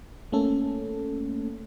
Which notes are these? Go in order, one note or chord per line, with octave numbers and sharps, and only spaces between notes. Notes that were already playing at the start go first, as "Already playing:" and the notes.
A3 A#3 C#4 A4